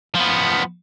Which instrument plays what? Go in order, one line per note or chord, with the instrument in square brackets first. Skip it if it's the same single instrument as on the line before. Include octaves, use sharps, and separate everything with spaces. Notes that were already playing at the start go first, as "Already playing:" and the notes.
[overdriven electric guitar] F3 B3